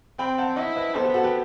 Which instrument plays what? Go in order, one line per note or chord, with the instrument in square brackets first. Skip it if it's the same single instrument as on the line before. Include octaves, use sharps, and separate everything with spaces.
[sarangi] C4 [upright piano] G5 B5
[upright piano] F#5 A5
[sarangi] E4 [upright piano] D#5 F#5
[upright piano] B4 D#5
[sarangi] B3 [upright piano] A4 C5
[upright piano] G4 B4
F#4 A4
G4 B4